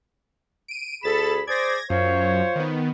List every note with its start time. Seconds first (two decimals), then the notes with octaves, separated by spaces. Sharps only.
0.68 D7 D#7
1.03 D2 G#4 A4 B5 A6 E7
1.47 G#4 C5 D5 G#6 A#6
1.90 F#2 F4 C5 C#5
2.56 D#3 B3